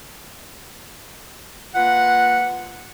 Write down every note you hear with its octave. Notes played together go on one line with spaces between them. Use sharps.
A#3 F4 B4 F#5